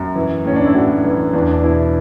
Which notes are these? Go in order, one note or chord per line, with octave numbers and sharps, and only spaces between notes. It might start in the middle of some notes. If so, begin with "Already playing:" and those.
Already playing: F#2
E3
A2 C#4
D4
E4
A2 F#4
E3
E2 D4
D4
B2 E4